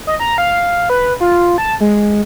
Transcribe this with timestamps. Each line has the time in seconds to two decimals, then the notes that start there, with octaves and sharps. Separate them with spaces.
0.07 D#5
0.20 A#5
0.38 F5
0.90 B4
1.20 F4
1.58 A5
1.81 G#3